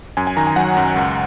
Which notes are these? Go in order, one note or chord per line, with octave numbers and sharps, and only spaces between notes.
F#2 G#5
G#5
D#3 A#5
G#5
F#3 F#5
F#2
C#2